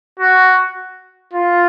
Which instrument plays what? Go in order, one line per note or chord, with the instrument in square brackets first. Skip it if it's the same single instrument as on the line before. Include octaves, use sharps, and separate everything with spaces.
[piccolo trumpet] F#4
F4